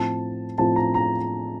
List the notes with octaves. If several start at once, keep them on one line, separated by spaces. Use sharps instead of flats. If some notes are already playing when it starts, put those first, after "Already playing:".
Already playing: A2 F3 C4 A5
A2 F3 C4 A5
A#5
A#5